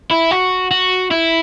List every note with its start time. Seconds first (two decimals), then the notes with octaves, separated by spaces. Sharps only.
0.11 E4
0.31 F#4
0.71 F#4
1.11 E4